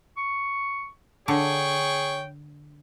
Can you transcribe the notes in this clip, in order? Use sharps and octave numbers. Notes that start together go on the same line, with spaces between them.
C#6
D3 G#4 C#5 G5 C#6